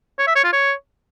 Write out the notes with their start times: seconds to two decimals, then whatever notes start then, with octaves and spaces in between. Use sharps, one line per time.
0.19 C#5
0.27 E5
0.36 C#5
0.44 F4
0.53 C#5